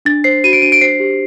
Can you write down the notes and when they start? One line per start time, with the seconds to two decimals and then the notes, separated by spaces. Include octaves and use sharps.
0.05 D4 A6
0.24 C5 C7
0.44 F#4 D#7
0.53 D7
0.62 D4 D#7
0.72 D7
0.81 C5 C7
1.00 G4